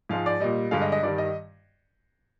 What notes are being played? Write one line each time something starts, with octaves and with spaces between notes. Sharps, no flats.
G#2 F3 G#3 F5
D5
A#2 G3 D#5
G2 D3 G#3 F5
D#5
D#5
G2 D#3 G3 D5
D#5